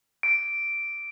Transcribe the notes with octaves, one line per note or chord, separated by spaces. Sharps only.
D7